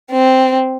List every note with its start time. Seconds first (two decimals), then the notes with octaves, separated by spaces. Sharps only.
0.12 C4